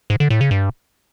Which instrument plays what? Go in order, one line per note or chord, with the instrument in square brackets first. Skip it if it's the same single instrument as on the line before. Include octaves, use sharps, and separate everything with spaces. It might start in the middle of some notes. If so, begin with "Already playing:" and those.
[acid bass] G#2
D3
A2
C#3
G2